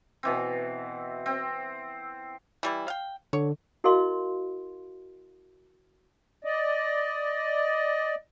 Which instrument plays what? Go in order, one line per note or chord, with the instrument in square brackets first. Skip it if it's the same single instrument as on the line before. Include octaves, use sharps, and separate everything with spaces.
[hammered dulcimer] B2 E3 C4
C4
[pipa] E3 G3 E4
F5 G5
[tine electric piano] D3 [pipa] C#5
[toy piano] E4 F#4 A#4 D#5 F5 C6
[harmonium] D5 D#5